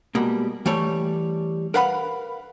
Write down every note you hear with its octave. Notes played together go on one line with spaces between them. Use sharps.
B2 G3 G#3 A#3
E3 G3 A3 C#5
A#4 B4 F5 F#5 B5